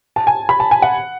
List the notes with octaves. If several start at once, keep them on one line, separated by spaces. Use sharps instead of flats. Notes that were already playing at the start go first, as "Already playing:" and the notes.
A5
G#5
B5
A5
G#5
F#5